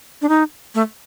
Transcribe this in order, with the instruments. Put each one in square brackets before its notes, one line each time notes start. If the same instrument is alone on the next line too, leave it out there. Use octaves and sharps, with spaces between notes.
[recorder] D4
D#4
A3